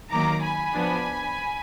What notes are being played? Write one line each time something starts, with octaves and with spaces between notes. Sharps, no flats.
D#3 F#3 A#3 A#5 D6
G#5 B5
F3 B3 D4